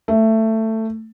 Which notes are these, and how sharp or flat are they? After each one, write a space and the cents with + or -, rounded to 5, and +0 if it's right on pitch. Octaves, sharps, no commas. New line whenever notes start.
A3 +15